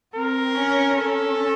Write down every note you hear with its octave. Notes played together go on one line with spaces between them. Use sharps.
C4 A#4
C#4
C#4 A4